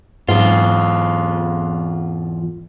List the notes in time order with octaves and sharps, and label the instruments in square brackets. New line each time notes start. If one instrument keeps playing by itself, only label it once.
[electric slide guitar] E2 F4 [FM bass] G#2